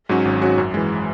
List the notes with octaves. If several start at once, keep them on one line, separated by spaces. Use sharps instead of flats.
G#2 F#3 C#4 F#4
G#1
G#2 F#3 C#4 F#4
F#2
E3 G#3